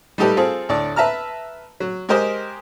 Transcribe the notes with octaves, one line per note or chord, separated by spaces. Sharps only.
G3 A3 D#4 G4 A4 B4
C4 F4 G#4 A4
D2 A2 D5
B4 E5 A5 A#5 F6
F#3
G#3 G4 A#4 C5 D#5 D#6